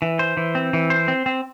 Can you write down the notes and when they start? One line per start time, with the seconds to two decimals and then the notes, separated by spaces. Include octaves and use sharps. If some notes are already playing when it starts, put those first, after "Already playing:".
0.02 E3
0.19 C5
0.37 E3
0.55 C4
0.73 E3
0.90 C5
1.08 C4
1.26 C4